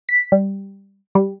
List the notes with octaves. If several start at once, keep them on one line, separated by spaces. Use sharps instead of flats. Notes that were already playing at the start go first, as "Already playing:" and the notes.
B6
G3
G3